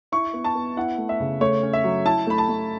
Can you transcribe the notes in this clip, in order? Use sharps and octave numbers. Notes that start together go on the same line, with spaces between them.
E4 C#6
B3
A5
B3
E4 F#5
A3
E5
C#3
A3 C#5
C#4
E5
F#3
E4 A5
A3 B5
A5
A3